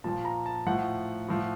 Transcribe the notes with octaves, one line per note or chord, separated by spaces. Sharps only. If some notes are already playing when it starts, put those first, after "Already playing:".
A#2 F3 A5
A#5
A5
A2 F3 F#5
A2 F3